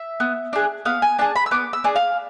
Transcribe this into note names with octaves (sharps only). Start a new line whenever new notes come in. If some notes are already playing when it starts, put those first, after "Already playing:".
Already playing: E5
B3
D4 G#4
B3 F5
G#5
D4 G#4 A5
B5
E6
B3 D6
E6
D4 G#4
F5